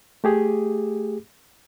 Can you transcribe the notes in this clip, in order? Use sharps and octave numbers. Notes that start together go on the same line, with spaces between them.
A3 G4 G#4